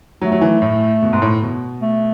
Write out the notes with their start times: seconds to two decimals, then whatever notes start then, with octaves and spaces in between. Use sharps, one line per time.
0.22 F#3 A3
0.32 F#3
0.41 E3
0.62 A2
1.03 B2
1.13 G#2
1.22 A2
1.42 B2
1.82 A3